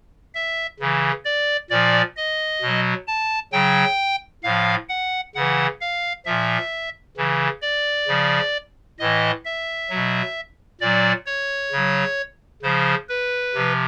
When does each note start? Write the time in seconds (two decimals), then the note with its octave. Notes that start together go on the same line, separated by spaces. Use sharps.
0.35 E5
0.80 C#3 E3
1.25 D5
1.70 A#2 F3 D5
2.17 D#5
2.62 B2 F#3
3.07 A5
3.52 C#3 F#3 G5
4.43 A2 F3 F5
4.89 F#5
5.35 C#3 E3 F#5
5.81 F5
6.26 A#2 F3 E5
7.17 C#3 E3
7.62 D5
8.08 C#3 F3
8.99 A2 E3 D#5
9.45 E5
9.90 B2 F#3
10.81 A#2 F#3 D5
11.26 C#5
11.72 C#3 F#3
12.63 C#3 F3 C5
13.09 B4
13.55 C3 F3